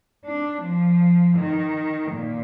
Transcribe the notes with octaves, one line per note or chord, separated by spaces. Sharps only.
D4
F3
D#3
A#2